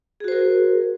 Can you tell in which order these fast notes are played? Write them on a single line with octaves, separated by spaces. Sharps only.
G#4 F#4 C5 A#4